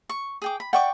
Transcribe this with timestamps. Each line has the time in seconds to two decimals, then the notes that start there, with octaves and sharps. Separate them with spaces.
0.09 C#6
0.42 G#4 G5 D6
0.60 B5
0.73 D5 E5 F#5 G5 C#6 D6